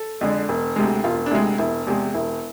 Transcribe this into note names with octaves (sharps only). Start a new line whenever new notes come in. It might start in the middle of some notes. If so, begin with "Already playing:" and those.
Already playing: A4
F2 D3 G#3
E1
D2 C3 G#3
E1 F4
D4
D2 C3 G#3 E4
E1 E4
E2 C3 G#3
E1 E4